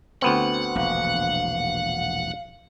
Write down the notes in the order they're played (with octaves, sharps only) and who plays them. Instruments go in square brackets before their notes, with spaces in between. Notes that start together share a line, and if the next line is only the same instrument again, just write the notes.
[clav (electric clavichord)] D2 B3 C4 [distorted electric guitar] F#5
[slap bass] E1 A#1 [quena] F5